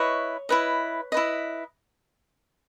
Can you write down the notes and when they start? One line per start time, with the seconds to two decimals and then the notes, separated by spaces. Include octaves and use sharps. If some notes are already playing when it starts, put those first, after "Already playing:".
Already playing: E4 B4 C#5 D#5 C#6
0.49 E4 B4 D#5
1.12 E4 B4 D#5